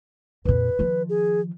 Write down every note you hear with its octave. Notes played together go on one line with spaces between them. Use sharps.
F2 A#2 B4
D#3 F3
G#4